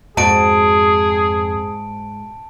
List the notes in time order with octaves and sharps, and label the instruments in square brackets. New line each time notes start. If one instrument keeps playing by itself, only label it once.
[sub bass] F2 [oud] G#2 F#4 D5 [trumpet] G#4 [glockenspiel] A5 D7